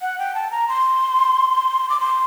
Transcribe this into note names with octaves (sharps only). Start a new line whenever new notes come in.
F#5
G5
A5
A#5
C6
D6
C6